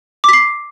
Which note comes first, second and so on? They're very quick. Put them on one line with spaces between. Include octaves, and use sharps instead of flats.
D6 B6 C7